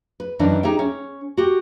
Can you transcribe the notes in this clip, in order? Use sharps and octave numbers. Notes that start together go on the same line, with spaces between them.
B4
F#2 D#3 E3 D4 D#4
D#4 G4 G#4 E5 G5
C#4
F#4 G4